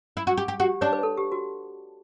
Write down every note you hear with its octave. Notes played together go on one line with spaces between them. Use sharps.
E4
F#4
G4
G4
F#4 G4
D4 C#5
B4
A4
G4
F#4